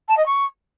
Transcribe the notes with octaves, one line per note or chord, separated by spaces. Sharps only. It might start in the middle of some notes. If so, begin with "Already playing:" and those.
A5
D#5
C#6